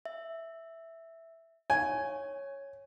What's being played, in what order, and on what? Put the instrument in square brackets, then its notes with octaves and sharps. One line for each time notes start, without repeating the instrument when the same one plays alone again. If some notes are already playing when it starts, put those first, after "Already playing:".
[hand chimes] E5
[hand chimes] C#5 [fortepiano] G#5